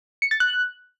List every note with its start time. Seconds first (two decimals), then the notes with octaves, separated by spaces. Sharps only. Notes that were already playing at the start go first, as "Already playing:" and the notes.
0.22 C#7
0.31 A6
0.40 F#6